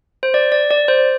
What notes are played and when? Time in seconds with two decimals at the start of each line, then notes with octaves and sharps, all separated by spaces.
0.23 C5
0.34 D5
0.52 D5
0.71 D5
0.88 C5